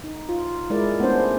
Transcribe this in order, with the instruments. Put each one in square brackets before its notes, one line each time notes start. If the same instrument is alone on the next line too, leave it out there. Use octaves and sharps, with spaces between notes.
[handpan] D#4
F4
G#3 E4 A#4 D5
A3 B3 C#4 D4 C5